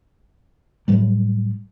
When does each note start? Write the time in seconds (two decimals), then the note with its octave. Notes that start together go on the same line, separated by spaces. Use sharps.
0.88 A2 F#3 G3